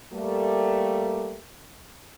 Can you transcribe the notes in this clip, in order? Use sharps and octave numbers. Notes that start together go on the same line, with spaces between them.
G3 A3 A#3